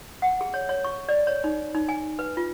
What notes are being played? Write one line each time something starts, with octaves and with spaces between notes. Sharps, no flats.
F#5
G#4
C#5
C#5
C#6
D5
C#5
D#4
D#4
G#5
B4
F4